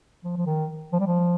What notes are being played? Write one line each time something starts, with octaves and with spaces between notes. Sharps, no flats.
F3
F3
D#3
F3
G3
F3